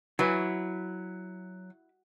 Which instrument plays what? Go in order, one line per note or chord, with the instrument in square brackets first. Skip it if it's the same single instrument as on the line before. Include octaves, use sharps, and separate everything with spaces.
[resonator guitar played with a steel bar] F#3 [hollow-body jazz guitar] E4 B4